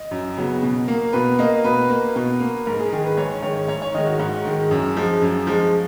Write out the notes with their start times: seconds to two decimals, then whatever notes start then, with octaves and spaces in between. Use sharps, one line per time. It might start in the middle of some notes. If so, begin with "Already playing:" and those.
Already playing: D#5
0.11 F#2
0.37 C#3 F#3 B3
0.63 B2
0.88 A#3
1.13 B2 B4
1.39 A#3 D#5
1.64 B2 B4
1.90 A#3
2.16 B2
2.40 A#3
2.66 G#2 A#4
2.79 G#4
2.92 D#3 G#3 G#4
3.04 B4
3.17 G#2 C#5
3.42 D#3 G#3 C#5
3.68 G#2 C#5
3.82 C#5
3.94 D#3 G#3 D#5
4.07 F#4
4.19 G#2 F#4
4.45 D#3 G#3
4.71 F#2
4.97 F3 G#3
5.22 F#2
5.47 F3 G#3